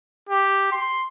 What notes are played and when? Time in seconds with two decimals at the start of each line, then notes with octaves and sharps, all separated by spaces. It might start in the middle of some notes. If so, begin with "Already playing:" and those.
0.29 G4
0.72 C6